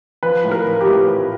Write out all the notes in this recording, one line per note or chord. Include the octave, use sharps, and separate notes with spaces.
F3 B4
A2
A#4
F3
G4
A2
F3